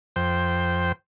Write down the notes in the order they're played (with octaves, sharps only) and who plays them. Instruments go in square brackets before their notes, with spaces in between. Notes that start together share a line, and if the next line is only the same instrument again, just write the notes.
[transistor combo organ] F2 C5 G5